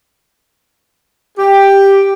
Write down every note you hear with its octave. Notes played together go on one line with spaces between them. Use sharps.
G4